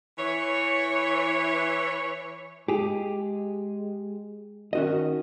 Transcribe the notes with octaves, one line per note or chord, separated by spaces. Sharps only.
E3 C#5
G#3 G4 G#4
D#3 C#4 F#4 D#5